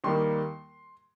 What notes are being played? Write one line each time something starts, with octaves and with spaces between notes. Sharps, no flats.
D#2 D#3 G3 A#3 C6